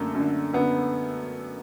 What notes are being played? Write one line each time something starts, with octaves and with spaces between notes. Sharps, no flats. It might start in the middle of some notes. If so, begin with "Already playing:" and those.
Already playing: F#2 D3 A3 A#3
F#2 D3
F#2 D3 B3